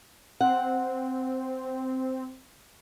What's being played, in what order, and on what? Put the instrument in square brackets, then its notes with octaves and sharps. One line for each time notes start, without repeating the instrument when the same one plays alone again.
[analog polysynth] C4 [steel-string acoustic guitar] F#5